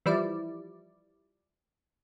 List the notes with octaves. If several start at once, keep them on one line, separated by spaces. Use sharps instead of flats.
E3 F3 G3 E4 D5